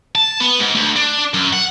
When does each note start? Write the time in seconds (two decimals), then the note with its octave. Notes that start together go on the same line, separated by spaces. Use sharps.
0.15 A5
0.41 B3
0.60 G#2
0.75 D2
0.96 D4
1.34 F#2
1.53 F#5